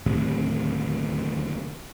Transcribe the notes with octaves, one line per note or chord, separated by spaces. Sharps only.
D1 D#2 A2 C3